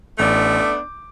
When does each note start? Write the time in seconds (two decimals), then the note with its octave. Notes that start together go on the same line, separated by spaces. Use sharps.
0.19 A1 A3 B3 D4 G6
0.60 D6